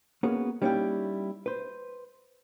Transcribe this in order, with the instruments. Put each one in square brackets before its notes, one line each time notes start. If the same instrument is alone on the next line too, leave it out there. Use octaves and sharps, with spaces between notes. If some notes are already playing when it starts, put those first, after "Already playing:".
[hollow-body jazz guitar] A#3 B3 C#4 F#4 G#4
G3 A#3 C#4 D#4 E4 G4
B4 C5